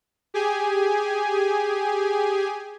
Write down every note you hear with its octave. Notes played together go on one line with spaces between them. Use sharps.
G4 G#4 G#5